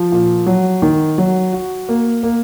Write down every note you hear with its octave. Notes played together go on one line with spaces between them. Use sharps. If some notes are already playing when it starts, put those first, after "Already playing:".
Already playing: F3
A#2
F#3
D#3
F#3
F#4
A#3
A#3